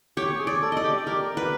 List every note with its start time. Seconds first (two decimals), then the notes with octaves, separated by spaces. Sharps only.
0.17 G4 C#5
0.39 G#4
0.47 D5
0.63 A4
0.72 D5 D#5
0.84 G4
1.06 G4 A#4
1.37 B4